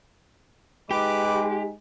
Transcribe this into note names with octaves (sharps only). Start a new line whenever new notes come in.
G#3 D#4 G4 B4 D6